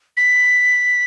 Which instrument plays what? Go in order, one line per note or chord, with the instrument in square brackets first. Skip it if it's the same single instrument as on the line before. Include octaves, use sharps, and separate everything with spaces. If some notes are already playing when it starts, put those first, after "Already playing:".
[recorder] B6